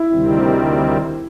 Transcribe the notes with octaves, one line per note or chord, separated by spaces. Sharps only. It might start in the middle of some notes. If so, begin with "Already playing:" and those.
Already playing: E4
D2 C3 D#3 G3 C4